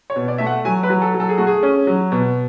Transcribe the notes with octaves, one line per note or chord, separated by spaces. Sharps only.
C#5
B2
D5
A3 E5
F#5
F#3 G#5
B4
F#3
A4
F#3
A4
G#4
A3 F#4
G#4
C#4
F#3
B2